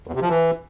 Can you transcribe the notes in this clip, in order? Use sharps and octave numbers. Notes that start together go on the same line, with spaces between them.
E2
C3
F3
E3